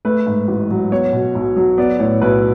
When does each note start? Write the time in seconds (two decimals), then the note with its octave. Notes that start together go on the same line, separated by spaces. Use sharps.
0.05 A3 B4
0.27 G#2
0.48 A1
0.71 F#3
0.91 B3 C#5
1.13 B2
1.35 B1
1.56 F#3
1.78 B3 D5
1.99 A2 C#5
2.21 B1 B4